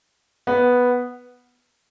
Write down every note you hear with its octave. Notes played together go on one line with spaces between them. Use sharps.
B3